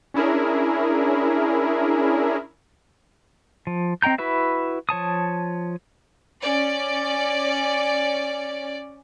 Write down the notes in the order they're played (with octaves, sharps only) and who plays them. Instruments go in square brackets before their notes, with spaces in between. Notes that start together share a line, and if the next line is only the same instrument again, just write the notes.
[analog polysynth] C#4 D4 E4 G#4 A#4
[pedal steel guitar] F3
C4 D#5 G5 A#5 G6
E4 F#4 B4 E5
F3 C#5 A5 D#6
[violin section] C#4 D5